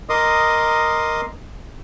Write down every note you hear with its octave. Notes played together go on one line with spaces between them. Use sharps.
A#4 D#5 C6 D6 D#6